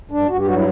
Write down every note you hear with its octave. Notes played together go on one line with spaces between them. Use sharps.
G2 D4
G2 F#4
G4
F#3 F#4
E4